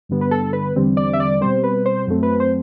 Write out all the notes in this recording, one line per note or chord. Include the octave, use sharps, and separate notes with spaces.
G2 D3 G3 B3
B4
A4
B4
E2 D3 G3 C4
D5
E5
D5
B2 G3 C4 C5
B4
C5
F#2 F#3 A3 C4
B4
C5